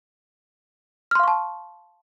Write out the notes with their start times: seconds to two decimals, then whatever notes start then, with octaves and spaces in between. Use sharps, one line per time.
1.11 F6
1.15 C6
1.19 F5
1.24 C#6
1.28 A5